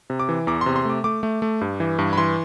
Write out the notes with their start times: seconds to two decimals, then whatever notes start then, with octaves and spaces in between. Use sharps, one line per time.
0.10 C3
0.19 D6
0.29 E3
0.47 E2 D6
0.61 C3 C6
0.76 C6
0.85 A3 D6
1.04 A3 D6
1.23 A3
1.42 A3
1.61 G2
1.80 E3
1.99 G2
2.13 B5
2.18 E3 C6